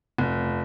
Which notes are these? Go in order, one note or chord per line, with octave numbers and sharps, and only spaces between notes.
F1